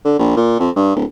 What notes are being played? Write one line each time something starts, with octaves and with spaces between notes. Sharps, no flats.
D3
A#1
A#2
F2
G2
D1